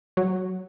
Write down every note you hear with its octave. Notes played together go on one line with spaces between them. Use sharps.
F#3